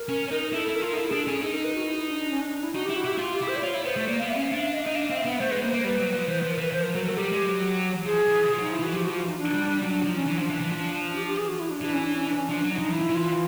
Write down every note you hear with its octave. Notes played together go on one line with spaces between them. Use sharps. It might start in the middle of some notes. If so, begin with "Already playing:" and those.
Already playing: A#4
C#4
D#4
E4 A4
E4
A#4
F4
D#4
E4 A4
D4 G#4
A4
C#4 G#4
D#4 G#4
A#4
B4
F#4
E4
E4
D4
D4
C#4
D4
D4
E4
D#4 F#4
E4 G4
F#4
E4 G4
F4
G4
E4
C5
D5
F4 C#5
E4
B3 C5
A3
A#3 D5
B3 F5
E5
C#4 F5
D4 F5
E5
D#5
D#4 D#5
D4 F5
C4 F5
E5
B3 F#5
A3 C5
G#3 B4
A#3 C5
A#3 B4
G3 B4
F#3
F3
B4
E3 C5
F3 B4
A#4
E3 B4
F3 C5
A#4
F#3 A#4
A4
F#3
G3 G4
G#3
F#3
F3 G#4
E3
F3
F#3
F3 D#4
E4
E3 F#4
F3 G4
F3 F#4
F4
D#4
D4
G3
G3
F#3 D4
D4
F3 D#4
C#4
E3 D4
F3
E3
E3
F3
G4
G4
G#4
F#4
E4
D4
E3 D4
C#4
D4
C#4
D4
C#4
F3 D4
F#3
D#4
F3
E3 E4
F3
E3
F4